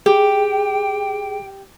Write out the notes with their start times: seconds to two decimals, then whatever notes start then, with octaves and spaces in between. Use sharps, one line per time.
0.06 G4 G#4 G5